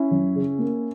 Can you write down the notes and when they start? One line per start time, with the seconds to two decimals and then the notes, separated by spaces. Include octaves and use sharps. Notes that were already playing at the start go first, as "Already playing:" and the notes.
Already playing: C#4 E4
0.11 F#2
0.35 C#3
0.59 A#3